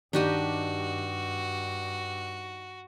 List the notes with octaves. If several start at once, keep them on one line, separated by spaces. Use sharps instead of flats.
G2 D#3 D4 F#4 G4 D#5